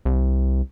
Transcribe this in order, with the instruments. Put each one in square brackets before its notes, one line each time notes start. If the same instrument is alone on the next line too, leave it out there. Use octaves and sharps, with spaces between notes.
[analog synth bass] C2